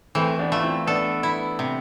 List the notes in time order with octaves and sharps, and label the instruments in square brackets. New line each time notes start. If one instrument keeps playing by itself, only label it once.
[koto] E3 [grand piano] A3 C4
[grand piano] B3 D4
[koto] A3 [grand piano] F4
[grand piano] C4 E4
[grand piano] B3 D4 [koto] A4
[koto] E4
C3